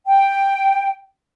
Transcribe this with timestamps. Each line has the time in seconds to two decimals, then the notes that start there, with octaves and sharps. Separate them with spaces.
0.07 G5